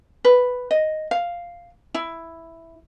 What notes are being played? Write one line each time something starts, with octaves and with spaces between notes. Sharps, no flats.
B4
D#5
F5
E4